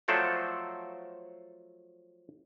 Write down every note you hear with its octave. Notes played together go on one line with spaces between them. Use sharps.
F3 F#3 A3 A4 C5 D5